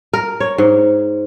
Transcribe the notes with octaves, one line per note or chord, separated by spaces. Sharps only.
A#4
C#5
G#2